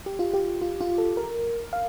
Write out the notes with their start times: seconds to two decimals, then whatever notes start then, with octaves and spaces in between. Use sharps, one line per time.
0.06 G4
0.19 F4
0.34 G4
0.62 F4
0.81 F4
0.98 A4
1.17 A#4
1.73 F5